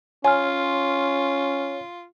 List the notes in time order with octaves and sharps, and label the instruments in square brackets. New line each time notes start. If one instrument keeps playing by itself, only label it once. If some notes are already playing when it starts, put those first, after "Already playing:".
[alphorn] C#4 [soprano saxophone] F4 [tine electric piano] C#5 C6 F6 [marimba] G#5